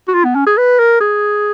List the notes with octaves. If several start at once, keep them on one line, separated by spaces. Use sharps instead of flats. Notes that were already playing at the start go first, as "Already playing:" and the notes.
F#4
F4
B3
C#4
G#4
B4
A#4
G#4